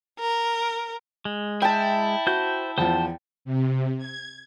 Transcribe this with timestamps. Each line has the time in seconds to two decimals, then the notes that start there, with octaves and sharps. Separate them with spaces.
0.18 A#4
1.25 G#3
1.62 E4 E5 G5 A5
2.27 F#4 C5 G6
2.78 E2 F3 C5 G5 A5
3.45 C3
3.98 G#6